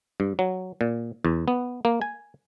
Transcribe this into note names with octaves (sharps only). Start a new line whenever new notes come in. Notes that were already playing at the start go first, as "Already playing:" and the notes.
G2
F#3
A#2
E2
B3
A#3
G#5